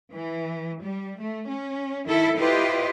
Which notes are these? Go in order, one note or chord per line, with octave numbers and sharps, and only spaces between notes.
E3
G3
A3
C#4
D#3 E4 A4
E4 F4 G4 B4 C5 D#5